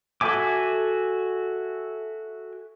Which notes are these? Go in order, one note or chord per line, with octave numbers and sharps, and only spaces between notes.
F#4 A4 E5 G#5 D6